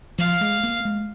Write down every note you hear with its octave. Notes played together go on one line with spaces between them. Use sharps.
F3 F5
G#3
A#3
G#3